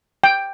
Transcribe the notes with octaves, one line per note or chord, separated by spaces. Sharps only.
G5